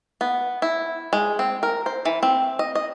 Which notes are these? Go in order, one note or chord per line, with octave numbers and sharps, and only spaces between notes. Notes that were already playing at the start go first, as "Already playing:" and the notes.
B3
E4
G#3
C4
A#4
C5
E3
C4
D#5
D#5